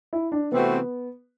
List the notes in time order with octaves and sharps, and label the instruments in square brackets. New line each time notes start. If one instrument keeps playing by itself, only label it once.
[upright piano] E4
D4
[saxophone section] C3 E3 A3 C4 F#4 [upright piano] B3